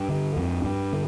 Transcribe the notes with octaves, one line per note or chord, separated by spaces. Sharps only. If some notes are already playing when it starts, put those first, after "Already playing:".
Already playing: G2 D4
D3
F2
G2
D3